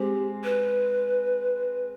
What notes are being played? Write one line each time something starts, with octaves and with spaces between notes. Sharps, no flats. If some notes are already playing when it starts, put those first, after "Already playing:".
Already playing: G#3 C4 G4
B4